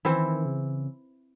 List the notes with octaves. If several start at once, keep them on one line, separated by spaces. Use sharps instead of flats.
D#3 E3 C4 E4
C#3